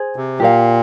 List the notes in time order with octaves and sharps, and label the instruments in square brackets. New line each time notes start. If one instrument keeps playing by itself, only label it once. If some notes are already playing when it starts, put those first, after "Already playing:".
Already playing: [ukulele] G#4 C5
[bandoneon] C3
[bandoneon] A#2 [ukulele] G4 A#4 F5